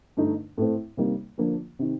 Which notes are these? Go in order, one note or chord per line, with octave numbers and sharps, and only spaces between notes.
G2 D3 A3 D#4
A2 A3 C4
C3 G3 A#3 D#4
D3 F3 A#3 D4
C3 D#3